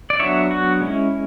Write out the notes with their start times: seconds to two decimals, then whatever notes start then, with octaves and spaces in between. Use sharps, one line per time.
0.10 D5
0.20 F#3 B3 D4 C#5 E5
0.51 F#4
0.81 G#3 C#4 E4